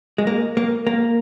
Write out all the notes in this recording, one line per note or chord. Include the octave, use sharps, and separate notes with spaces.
G#3
A#3
A#3
A#3